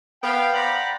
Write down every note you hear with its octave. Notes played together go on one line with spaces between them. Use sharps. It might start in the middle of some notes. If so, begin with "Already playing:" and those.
B3 F5 G5
C5 D5 F#5 G5 A#5 B5